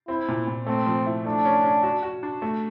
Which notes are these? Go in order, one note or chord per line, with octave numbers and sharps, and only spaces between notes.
C4 E4
A#2
A#2
A3 C4
F3
E4
A3 D4
C#4
C#4
F#4
F#4
D4
A3